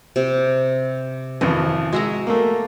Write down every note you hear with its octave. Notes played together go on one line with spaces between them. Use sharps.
C3
G#1 F2 E3 D#5
G#3 F#4 E5 A#5
A3 A#3